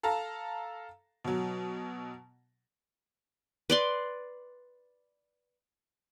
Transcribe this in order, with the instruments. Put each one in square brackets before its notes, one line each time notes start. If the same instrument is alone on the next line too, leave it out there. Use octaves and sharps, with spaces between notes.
[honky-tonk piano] A4 F5 A5 A#5
B2 F#3
[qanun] B4 D5 C6